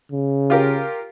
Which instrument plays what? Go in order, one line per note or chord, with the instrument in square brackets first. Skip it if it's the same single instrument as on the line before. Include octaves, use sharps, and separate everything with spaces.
[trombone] C#3
[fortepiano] F4 G4 A#4